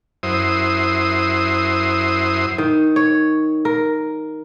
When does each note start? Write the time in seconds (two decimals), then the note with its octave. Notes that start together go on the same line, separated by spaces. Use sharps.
0.23 F#2 E4 C5 D#6
2.58 D#3
2.96 C#5
3.65 A#4